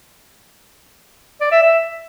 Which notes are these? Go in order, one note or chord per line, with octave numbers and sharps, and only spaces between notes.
D5
E5
E5